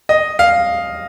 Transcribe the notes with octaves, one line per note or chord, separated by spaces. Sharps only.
D#5
F5